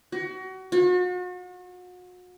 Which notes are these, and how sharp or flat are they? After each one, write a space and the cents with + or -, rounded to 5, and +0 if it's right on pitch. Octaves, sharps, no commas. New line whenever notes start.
F#4 +30
F#4 -40